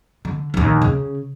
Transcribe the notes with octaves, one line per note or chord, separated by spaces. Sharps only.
D3
A#1 D#2
C#3